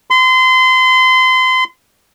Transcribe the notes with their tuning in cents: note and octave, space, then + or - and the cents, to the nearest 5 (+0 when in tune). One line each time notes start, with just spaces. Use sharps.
C6 -30